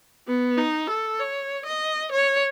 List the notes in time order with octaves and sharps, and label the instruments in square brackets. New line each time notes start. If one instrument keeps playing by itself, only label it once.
[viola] B3
D#4
A4
C#5
D#5
C#5